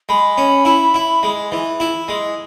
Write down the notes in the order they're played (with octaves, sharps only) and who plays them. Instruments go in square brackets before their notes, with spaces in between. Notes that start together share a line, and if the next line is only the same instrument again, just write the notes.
[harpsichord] G#3 [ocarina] B5
[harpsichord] C#4
E4
E4
G#3
E3
E4
G#3